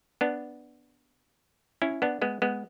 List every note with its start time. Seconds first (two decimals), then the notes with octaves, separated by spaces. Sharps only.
0.21 B3 D4
1.82 C#4 E4
2.02 B3 D4
2.22 G#3 B3
2.42 G#3 B3